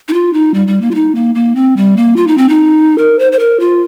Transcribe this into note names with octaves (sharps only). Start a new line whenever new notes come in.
D#4
F4
D#4
G3
G3
A#3
F4
D#4
A#3
A#3
C4
G3
A#3
F4
D#4
C4
D#4
A#4
C5
C5
A#4
F4